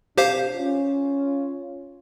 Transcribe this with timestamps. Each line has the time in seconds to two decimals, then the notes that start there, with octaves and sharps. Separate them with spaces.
0.18 C3 D4 G4 C5 F5
0.56 C#4 F4